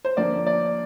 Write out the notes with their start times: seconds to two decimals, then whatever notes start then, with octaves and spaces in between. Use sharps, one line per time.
0.05 C5
0.17 D3 F3 A#3 D5
0.47 D5